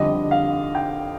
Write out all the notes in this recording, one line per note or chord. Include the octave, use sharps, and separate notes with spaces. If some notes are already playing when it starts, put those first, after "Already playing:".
Already playing: F2 D3 G3 D#5
F5
G5